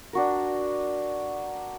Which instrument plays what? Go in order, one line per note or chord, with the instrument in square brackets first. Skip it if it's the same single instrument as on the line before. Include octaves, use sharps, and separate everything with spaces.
[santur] D4 F#4 A#4